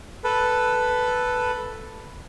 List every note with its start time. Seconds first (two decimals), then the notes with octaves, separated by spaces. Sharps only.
0.24 A4 B4